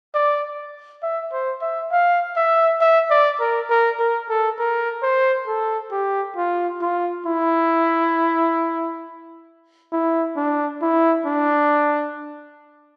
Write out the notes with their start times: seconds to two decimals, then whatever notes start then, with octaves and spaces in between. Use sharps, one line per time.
0.14 D5
1.03 E5
1.33 C5
1.61 E5
1.92 F5
2.36 E5
2.81 E5
3.10 D5
3.40 A#4
3.70 A#4
3.99 A#4
4.29 A4
4.59 A#4
5.03 C5
5.47 A4
5.92 G4
6.36 F4
6.81 F4
7.26 E4
9.92 E4
10.36 D4
10.82 E4
11.26 D4